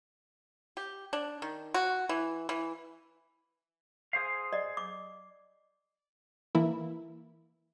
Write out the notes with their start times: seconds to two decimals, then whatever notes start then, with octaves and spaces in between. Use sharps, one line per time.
0.77 G4
1.13 D4
1.42 D#3
1.74 F#4
2.09 E3
2.49 E3
4.13 G#4 C5 F5
4.53 D5 D#5
4.77 D6
6.55 E3 A#3 E4